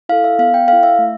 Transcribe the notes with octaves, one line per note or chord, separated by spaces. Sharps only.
E4 A4 F5
E5
B3 F5
G5
E4 A4 F5
E5
A3